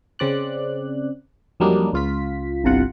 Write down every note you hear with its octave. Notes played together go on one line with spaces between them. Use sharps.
C#3 C4 D5 F#6
F2 F#3 G3 A#3 D4 D#4
C#2 F4 B6
G1 C2 C3 F4 F#5